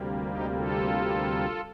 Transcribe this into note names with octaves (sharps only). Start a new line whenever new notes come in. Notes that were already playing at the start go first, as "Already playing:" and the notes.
Already playing: D2 C3 G3 A#3
D#4 G4
F4 A4